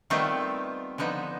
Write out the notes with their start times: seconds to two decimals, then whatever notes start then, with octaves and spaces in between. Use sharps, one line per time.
0.10 D#3 G3 A3 B3 C4 F4
0.98 D3 F3 B3 D#4